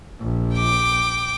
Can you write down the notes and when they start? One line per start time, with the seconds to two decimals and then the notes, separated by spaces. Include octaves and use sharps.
0.20 A#1
0.56 G5 D6